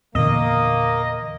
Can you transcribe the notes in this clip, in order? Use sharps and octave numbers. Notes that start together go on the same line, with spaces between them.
E2 A#2 D3 A#3 D#5